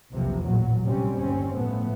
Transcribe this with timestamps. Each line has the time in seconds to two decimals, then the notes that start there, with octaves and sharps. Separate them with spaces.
0.12 B1 E2 C3 F3 A#3
0.41 A1 A#2 F#3
0.85 C3 G3 C4 C#4
1.17 G1 D#2 C4 C#4
1.51 A2 F3 A3 B3